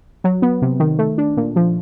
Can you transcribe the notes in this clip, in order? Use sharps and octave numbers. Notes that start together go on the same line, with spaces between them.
F#3
B3
C3
D#3
A3
D4
A#2
F3